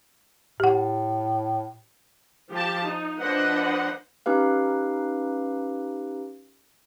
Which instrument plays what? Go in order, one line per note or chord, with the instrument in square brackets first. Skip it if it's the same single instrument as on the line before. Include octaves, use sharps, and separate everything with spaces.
[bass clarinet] A2 [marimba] G4 F#5
[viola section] F3 G4 A5
D#4
F3 D4 B4 C5 D#5 F#5
[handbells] C#4 D#4 G4 B4 F5